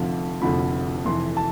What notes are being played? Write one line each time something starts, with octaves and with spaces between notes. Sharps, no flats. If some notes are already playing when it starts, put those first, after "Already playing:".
Already playing: F1 F2 D3 F3 F5
F1 F2 D3 F3 B5
F1 F2 E3 C6
A5